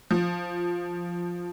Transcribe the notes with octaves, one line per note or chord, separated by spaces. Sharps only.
F3